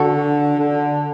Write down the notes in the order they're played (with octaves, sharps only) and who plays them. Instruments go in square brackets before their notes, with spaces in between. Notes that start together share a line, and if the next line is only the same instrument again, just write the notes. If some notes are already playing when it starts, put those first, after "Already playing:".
Already playing: [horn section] D3 [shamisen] F#4 A4
[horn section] D3